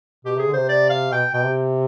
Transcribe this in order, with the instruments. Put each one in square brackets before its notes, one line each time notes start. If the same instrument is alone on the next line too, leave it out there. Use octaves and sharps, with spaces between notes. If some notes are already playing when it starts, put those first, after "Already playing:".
[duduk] B2 [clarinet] G4
[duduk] C3 [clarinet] G#4
[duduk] D3
[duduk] C3 [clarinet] C5
[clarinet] D5
F5
[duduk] B2 [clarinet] G5
[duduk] B2 [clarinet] G5
[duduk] C3